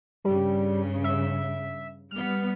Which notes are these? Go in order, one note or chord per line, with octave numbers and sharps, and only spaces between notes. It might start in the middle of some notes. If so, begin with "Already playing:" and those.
G2 C#3 G3
E5
G3 B3 F6